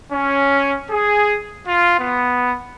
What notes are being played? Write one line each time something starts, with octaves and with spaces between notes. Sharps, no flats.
C#4
G#4
F4
B3